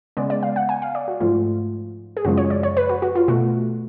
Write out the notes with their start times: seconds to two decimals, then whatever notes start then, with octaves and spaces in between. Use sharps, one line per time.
0.17 C#3 G#3 B3 D5
0.30 D5
0.43 F5
0.56 F#5
0.69 G#5
0.82 F5
0.95 D5
1.08 F#4
1.21 G#2 F3 A3 F4
2.17 G#4
2.25 F#2 C#3 F3 G#3 F#4
2.37 C#5
2.50 D5
2.63 C#5
2.77 B4
2.89 F#4
3.02 F#4
3.15 F4
3.28 B2 A3 F#4